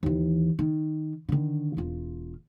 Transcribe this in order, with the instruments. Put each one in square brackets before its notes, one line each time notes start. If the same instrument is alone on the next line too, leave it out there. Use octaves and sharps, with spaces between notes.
[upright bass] D#2 E3
D#3
D3 D#3
E1 F4